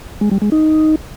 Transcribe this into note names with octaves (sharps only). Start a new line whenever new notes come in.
G#3
G3
G#3
D#4